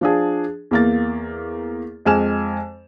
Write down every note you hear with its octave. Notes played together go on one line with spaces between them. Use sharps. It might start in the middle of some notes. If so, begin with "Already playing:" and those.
F3 D4 G#4
E2 A#3 A6
F2 G#3 G#5 F6 E7